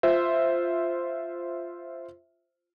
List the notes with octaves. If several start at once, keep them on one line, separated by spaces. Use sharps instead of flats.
F4 C5 E5